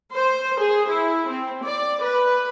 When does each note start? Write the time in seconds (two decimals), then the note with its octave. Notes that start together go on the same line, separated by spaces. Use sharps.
0.13 C5
0.58 G#4
0.89 E4
1.29 C4
1.62 D5
2.03 B4